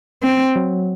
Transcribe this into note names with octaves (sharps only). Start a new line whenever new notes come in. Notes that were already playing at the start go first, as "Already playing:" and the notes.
C4
F#3